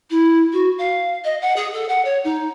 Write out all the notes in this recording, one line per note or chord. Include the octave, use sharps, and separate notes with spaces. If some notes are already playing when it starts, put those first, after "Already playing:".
E4
F#4
F5
D#5
F#5
G#4
A4
F#5
C#5
D#4